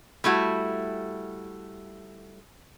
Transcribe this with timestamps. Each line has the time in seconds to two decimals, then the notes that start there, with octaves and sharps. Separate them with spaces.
0.24 G3 A3 E4 F#4